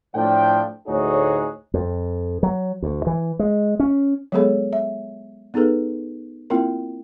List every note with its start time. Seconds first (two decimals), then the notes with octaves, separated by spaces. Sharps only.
0.15 A2 F3 D4 G5
0.87 D2 A2 D#4 F#4 G#4 C#5
1.74 F2
2.43 F#3
2.82 D2
3.07 E3
3.39 G#3
3.80 C#4
4.32 F#3 G#3 B3 G#4 A4 C#5
4.73 E5
5.54 B3 D#4 G#4 A4 B4
6.50 A#3 C4 E4 F4 A#4